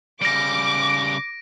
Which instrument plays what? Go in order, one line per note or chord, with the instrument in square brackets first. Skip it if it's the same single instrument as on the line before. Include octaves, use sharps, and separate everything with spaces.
[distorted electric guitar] C#3 G3 [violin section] D6 [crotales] A#6 D7